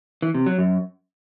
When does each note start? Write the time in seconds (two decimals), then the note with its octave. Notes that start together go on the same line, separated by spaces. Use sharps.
0.22 E3
0.34 C3
0.46 F#3
0.58 F#2